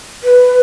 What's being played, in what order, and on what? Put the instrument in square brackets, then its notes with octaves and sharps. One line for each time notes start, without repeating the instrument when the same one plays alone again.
[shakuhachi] B4